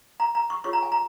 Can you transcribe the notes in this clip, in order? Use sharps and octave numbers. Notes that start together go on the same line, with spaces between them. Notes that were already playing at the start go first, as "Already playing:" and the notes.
A#5
A#5
C#6
F4 G#4 C#5 C#6
A#5
G#5
A#5